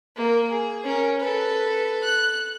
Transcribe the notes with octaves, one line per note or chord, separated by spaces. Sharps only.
A#3 A#4
G#4
C#4 A#4
A4 B4
F#6